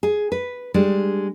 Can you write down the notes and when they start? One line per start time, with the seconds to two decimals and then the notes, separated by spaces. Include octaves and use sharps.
0.03 G#4
0.32 B4
0.74 G3 G#3 D4